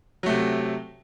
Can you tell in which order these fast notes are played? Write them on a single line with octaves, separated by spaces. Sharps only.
F#3 A3 C3